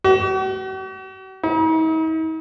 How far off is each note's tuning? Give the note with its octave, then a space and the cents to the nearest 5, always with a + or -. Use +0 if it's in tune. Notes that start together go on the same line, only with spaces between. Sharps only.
F#4 +45
D#4 +45